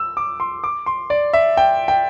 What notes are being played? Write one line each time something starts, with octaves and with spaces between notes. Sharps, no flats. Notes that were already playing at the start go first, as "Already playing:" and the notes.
Already playing: E6
D6
C6
D6
C6
D5
E5
G5
G5